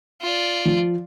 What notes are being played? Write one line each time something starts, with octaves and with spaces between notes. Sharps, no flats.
F4 D5
F3